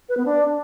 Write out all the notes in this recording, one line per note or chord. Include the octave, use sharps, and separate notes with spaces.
B4
B3
D4